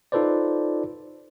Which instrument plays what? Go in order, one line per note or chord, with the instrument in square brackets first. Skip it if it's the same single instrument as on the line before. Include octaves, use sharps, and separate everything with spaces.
[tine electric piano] D#4 F4 A4 B4 C5 D5